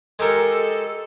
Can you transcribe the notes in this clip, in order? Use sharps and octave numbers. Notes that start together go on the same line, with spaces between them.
G#3 G4 A4 A#4